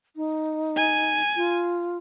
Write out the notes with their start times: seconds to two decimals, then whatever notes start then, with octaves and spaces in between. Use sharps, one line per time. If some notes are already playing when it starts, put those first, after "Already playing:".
0.16 D#4
0.77 G#5
1.36 F4